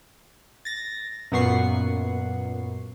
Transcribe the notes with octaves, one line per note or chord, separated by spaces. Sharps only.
A6 A#6
F#2 A#2 B3 F#5 C#6 C7